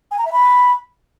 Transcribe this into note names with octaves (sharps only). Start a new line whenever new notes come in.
G#5
A#5
E5
B5